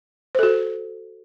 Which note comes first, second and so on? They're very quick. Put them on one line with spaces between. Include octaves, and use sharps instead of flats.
C5 A4 F#4